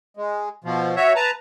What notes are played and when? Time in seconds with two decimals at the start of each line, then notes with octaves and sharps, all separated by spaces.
0.17 G#3
0.64 B2 F3
0.96 F#4 C#5 E5
1.16 B4 A5 A#5